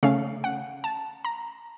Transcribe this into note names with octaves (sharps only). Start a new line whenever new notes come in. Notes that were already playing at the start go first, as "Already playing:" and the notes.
C#3 A3 C#4 F5
F#5
A5
A#5